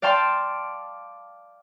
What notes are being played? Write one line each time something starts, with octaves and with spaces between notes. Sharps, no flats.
D5 F5 G5 A5 C6